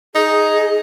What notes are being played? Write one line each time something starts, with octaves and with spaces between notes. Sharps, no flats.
D#4 G#4